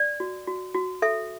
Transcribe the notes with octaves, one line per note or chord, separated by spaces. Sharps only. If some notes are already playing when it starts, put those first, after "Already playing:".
Already playing: D5
F#4
F#4
F#4
A4 E5